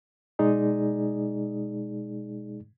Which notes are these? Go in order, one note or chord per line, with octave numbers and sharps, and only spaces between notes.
B2 G#3 D#4 G#4 D5